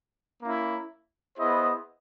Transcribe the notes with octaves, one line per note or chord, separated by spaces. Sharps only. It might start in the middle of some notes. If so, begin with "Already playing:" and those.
A#3 C#4 E4
B3 E4 G#4 C5 D#5